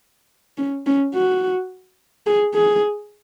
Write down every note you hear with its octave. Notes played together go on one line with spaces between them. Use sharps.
C#4
C#4
F#4
G#4
G#4